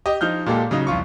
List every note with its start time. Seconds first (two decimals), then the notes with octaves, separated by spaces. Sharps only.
0.06 G4 D#5
0.21 F3 D#4 F6 G6
0.46 A#2 G#3 A#3 G4 A4
0.71 C#3 F#3 D#4
0.87 C2 F2 F4 C#6